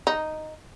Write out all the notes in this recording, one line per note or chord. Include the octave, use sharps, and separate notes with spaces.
D#4